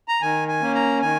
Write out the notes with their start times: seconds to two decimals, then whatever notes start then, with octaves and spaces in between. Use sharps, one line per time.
0.08 A#5
0.22 D#3 G#5
0.48 G#5
0.61 A#3 C#4
0.75 A#5
1.01 D#3 G#5